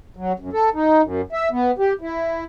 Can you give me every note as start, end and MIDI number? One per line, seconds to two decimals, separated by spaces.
0.16 0.32 54
0.39 0.50 42
0.53 0.69 69
0.74 1.02 63
1.02 1.21 42
1.32 1.49 76
1.51 1.71 59
1.78 1.93 67
2.01 2.44 64